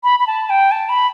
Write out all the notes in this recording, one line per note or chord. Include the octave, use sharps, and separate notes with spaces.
B5
B5
A5
G5
A5
B5